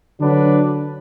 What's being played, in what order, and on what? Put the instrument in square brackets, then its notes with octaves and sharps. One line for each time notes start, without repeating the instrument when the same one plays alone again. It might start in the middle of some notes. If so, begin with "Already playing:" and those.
[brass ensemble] D3 F#3 D4 B4